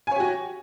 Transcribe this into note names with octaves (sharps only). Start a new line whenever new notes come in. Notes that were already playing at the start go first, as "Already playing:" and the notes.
F#4 G4 C#5 G#5